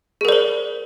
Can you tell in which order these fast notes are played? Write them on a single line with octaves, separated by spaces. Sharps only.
G#4 A#4 D5 C5